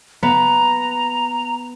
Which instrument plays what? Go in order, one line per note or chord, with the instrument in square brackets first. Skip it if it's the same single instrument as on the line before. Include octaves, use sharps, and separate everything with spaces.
[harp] B3 [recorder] A#5